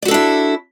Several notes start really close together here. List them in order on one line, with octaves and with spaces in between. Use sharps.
D5 F#4 A4 D4 E4